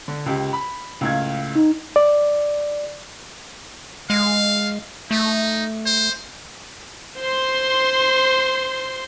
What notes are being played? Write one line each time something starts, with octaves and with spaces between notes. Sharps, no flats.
D3
C#2 G4
B5
C#2 A2 F5 G#6
D#4
D5
G#3 F5
A3 D#4
C5
C5 C6